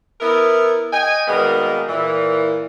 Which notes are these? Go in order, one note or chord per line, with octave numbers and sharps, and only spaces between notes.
B3 E4 A#4
D#5 G5 G#5
B2 D#3 G3 G#3 A#3 B3
A#2 E3